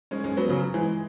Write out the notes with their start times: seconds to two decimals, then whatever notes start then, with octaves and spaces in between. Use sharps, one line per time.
0.11 G#3 C#4
0.24 G#3 C#4
0.37 F#3 B3
0.49 C#3 F#3
0.74 E3 G#3